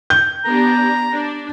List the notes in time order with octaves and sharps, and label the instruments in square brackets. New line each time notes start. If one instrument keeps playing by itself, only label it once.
[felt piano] G6
[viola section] B3 D4 G4 [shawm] A#5
[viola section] D4